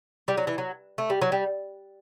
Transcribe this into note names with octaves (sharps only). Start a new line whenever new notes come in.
G3
F#3
E3
F#3
A3
G3
F#3
G3